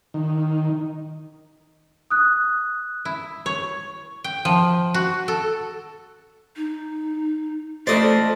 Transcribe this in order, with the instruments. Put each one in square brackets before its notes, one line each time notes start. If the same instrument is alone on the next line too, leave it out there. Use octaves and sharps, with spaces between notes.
[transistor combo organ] D#3
[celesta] D#6 F#6
[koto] E4
C#5
G5
F3
F#4
A4
[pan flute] D#4
[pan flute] A3 [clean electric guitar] A4 C5 [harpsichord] D5 D#5